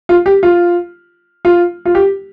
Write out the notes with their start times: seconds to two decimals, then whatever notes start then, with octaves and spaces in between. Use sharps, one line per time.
0.09 F4
0.26 G4
0.43 F4
1.45 F4
1.85 F4
1.95 G4